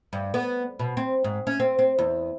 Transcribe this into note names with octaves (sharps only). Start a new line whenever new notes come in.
G2
B3
B2
C4
G#2
C#4
C4
C4
E2